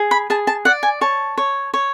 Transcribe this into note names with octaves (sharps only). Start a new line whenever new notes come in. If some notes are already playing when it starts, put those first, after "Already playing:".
Already playing: G#4
B5
G#4 A5
A5
D5 F#5
G#5
C#5 A5
C#5
C#5